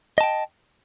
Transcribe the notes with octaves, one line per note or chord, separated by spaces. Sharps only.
D#5 G5 A5